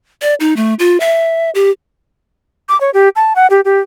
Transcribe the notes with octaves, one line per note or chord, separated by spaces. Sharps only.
D5
D#4
A3
F4
E5
G4
D6
C#5
G4
A5
F#5
G4
G4